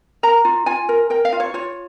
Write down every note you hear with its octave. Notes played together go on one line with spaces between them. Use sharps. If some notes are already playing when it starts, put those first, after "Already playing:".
A#4 A#5
F4
F4 G#5
A#4
A#4 G5
F5
F4
C#5
F4 C#5